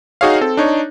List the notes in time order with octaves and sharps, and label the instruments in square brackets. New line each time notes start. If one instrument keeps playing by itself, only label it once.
[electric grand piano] D#4 F#4 G#4 C#5 F5
C4 A4
D4 D#4 C#5